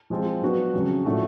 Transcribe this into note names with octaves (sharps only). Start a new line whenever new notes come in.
F3 G#3 C4 F4
F#3 B3 D4 F#4 B4
F2 C#3 F#3
A2 F3 A3 D4 F#4